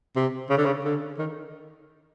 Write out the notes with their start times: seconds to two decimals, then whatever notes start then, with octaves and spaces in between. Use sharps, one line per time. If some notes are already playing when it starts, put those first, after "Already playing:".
0.16 C3
0.50 C#3
0.58 D3
0.65 C#3
0.84 D3
1.18 D#3